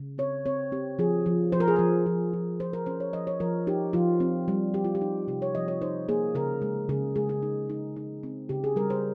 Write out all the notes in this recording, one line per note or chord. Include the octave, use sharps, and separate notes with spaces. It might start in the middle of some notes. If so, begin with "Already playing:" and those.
Already playing: C#3
C4 C#5
C4 C#5
C4 G4
F3 G#4
F3
F3 C5
A#4
G#4
F3 A#4
F3
F3
F3 C5
A#4
C#4 C5
C#5
F3 D#5
C#5
F3 A#4
D#4 G4
F3 F4
C4
G3
G3 G4
F4
G4
D#4
C3 G4
C#5
F3 D#5
C#5
D#4 C5
A#3 G#4
C#3 A#4
G#3
C#3 G#4
G#3 G#4
G#4
D#4
D#4
D#4
C4
C#3 G4
G#4
G3 A#4
C5